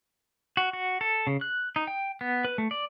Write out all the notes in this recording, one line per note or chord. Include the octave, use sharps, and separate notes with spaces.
F#4
F#4
A4
C#3
F#6
D#4
G5
B3
B4
A3
D5